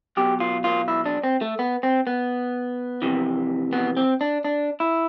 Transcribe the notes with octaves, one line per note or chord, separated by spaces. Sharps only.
B1 B2 G4
F4
F4
E4
D4
C4
A3
B3
C4
B3
F2 C3 E3
B3
C4
D4
D4
E4